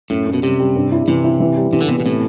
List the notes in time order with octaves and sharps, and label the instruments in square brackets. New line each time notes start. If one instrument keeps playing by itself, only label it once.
[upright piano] F#2 [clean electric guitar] A2
[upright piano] F#2
[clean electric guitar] B2
[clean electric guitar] C3 [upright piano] G3
[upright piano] G3
G2
E4
[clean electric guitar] C3 [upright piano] E3
[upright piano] E4
E3
G3
[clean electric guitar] C3 [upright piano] E3
[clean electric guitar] D3
[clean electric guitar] C3 [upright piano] B3
[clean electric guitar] B2
[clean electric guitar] A2 [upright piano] C3